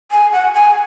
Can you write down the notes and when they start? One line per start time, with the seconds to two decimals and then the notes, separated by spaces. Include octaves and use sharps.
0.11 G#5
0.32 F#5
0.54 G#5